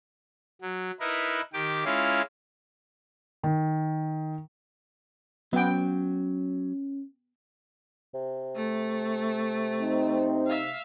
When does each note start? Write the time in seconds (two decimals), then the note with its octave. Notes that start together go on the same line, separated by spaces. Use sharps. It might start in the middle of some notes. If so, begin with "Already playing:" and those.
0.62 F#3
1.00 D#4 E4 A#4 B4
1.53 D#3 G4 D6
1.85 G#3 C#4 E4 F4 F5
3.43 D#3
5.53 F#3 B3 C#4 G5
8.14 C3
8.56 A3
9.81 C4 D#4
10.47 E5 F5